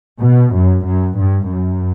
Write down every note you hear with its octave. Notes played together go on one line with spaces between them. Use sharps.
B2
F#2
F#2
G2
F#2